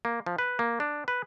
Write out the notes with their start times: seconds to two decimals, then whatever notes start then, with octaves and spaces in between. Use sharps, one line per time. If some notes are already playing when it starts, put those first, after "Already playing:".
0.05 A#3
0.26 F3
0.39 B4
0.59 A#3
0.80 D4
1.08 B4